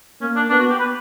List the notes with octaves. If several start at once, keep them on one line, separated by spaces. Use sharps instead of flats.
A#3 C#4
D4
B3 D4
F#4
G4
B4